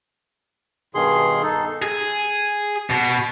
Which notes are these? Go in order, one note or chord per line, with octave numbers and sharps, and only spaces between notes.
G2 B2 D#3 G#4 C6
D#4 A4
G#4
B2